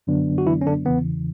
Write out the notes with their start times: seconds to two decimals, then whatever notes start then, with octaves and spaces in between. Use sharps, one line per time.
0.07 F#2 D3 F#3 B3 D4
0.38 F#4
0.47 E3 E4
0.61 C#4
0.67 D3 D4
0.86 E2 C#3 E3 B3